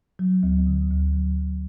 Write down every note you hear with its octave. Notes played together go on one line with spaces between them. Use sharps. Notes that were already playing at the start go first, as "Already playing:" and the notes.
F#3
D2
D3
D2
F#3